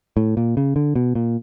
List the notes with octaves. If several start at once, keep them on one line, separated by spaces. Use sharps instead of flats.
A2
A#2
C#3
D3
B2
A#2